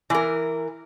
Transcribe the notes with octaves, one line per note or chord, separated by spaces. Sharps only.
E3 A#4